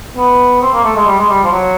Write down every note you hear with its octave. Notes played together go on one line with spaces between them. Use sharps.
B3
C4
A#3
A3
G#3
G3
G#3
G3
F3
F#3